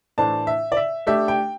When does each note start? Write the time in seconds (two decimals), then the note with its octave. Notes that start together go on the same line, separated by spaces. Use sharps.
0.18 A2 E3 A3 D4 C5 A5
0.47 E5
0.72 D5
0.77 E5
1.07 A3 D4 G4 E5
1.28 G5